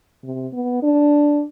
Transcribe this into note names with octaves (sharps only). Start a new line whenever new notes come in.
C3
B3
D4